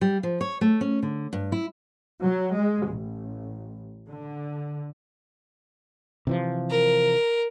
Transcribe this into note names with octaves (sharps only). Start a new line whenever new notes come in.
G3
F3
C#5
A3
C#4
D3
G2
E4
F#3
G#3
A1
D3
C3 E3 F3
A#4